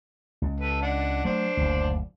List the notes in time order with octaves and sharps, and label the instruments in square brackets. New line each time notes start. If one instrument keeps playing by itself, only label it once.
[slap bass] C#2
[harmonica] A4 B4
D4 F#5
[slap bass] F#3 A3 [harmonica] D4 C5
[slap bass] F#1 D2